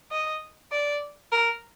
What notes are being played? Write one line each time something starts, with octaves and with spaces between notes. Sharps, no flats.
D#5
D5
A#4